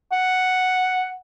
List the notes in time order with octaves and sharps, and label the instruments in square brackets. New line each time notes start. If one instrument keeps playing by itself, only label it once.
[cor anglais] F#5